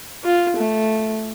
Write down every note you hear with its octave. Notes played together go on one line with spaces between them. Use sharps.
F4
A3